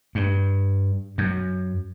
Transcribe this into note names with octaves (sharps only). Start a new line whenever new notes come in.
G2
F#2